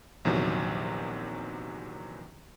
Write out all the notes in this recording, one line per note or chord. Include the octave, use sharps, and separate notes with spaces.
A#1 E2 C3 D#3 F#3